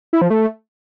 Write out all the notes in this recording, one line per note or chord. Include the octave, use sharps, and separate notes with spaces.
E4
F3
A3